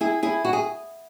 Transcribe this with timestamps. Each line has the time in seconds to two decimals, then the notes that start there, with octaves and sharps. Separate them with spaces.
0.01 E4 G#4
0.23 E4 G#4
0.45 F#4
0.53 G#4